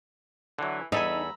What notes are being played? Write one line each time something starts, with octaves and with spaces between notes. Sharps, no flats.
D3 E3 F#3
E2 D#4 A4 E5 G#5 A#5 B5